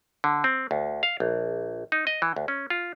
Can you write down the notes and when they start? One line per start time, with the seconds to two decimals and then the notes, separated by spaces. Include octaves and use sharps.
0.24 D3
0.44 C4
0.71 D2
1.03 F5
1.20 A#1
1.92 D#4
2.07 D#5
2.22 E3
2.36 D2
2.48 C#4
2.70 F4